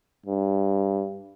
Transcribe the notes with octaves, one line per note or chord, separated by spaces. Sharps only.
G2